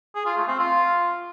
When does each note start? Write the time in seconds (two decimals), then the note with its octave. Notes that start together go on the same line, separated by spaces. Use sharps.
0.15 G#4
0.26 F4
0.37 A3
0.48 C4
0.59 F4